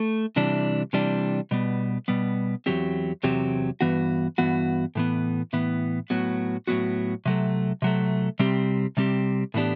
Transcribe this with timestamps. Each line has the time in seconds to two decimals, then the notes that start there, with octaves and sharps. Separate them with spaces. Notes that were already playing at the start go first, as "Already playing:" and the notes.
Already playing: A3
0.36 C3 E3 G3 D4
0.93 C3 E3 G3 D4
1.51 B2 G3 B3
2.08 B2 G3 B3
2.66 E2 C3 F#3 C4 G4
3.23 E2 C3 F#3 C4 G4
3.81 G2 E3 B3 F#4
4.38 G2 E3 B3 F#4
4.95 A2 E3 B3
5.53 A2 E3 B3
6.10 A2 F#3 B3 F#4
6.67 A2 F#3 B3 F#4
7.26 C3 F#3 A3
7.82 C3 F#3 A3
8.39 C3 G3 C4 G4
8.97 C3 G3 C4 G4
9.54 A2 E3 B3 D4 G4